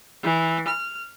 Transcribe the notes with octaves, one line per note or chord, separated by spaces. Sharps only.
E3
F6